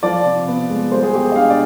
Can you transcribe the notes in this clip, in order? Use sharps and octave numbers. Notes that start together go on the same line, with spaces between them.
F3 D5
C3
B3
G#3
G3 C5
G#4
B2 G4
G#4
D#5
D4 F5
D5